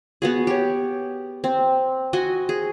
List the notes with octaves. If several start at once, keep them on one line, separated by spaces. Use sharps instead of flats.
B3 F#4 G#4
G4 C#5
C4
F#4 D#5 G#5
G#4